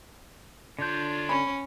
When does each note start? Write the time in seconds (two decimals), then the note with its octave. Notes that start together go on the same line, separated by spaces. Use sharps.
0.79 D3 D4 F4 C#5 G6
1.29 C#4 B5